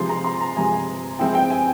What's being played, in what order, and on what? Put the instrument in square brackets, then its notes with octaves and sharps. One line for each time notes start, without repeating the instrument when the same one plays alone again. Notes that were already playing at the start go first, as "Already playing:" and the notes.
Already playing: [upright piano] C3 F3 G#3 C6
A#5
C6
A#5
C3 F3 G#3 G#5
F3 G#3 C4 E4 G5
G5
G#5